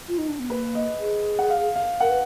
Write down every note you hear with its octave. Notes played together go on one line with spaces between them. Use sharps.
F4
D#4
D4
B3
A#3 B4
D#5
G#4
F#5
F5
F5
A#4 F#5
B4